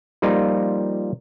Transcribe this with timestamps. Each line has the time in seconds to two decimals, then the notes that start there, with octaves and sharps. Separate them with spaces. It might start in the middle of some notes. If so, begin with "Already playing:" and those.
0.22 F3 G3 A#3 D#4 F4